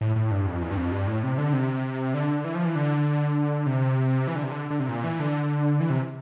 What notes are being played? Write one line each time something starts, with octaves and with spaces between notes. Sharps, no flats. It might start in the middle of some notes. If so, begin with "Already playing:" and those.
A2
A2
G2
F2
E2
G2
F2
G2
A2
C3
D3
C3
D3
E3
F3
E3
D3
C3
E3
D3
C3
D3
D3
C3
A#2
E3
D3
E3
C3